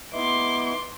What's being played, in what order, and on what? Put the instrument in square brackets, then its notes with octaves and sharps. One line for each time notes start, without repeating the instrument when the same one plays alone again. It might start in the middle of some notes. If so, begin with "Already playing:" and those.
[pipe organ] B3 D#4 E4 [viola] C6 D6